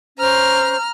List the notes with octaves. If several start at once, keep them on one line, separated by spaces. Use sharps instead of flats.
C#4 C5 A#5 F6